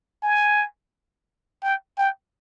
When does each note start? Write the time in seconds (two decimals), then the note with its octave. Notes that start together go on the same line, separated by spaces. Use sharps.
0.23 G#5
1.63 G5
1.98 G5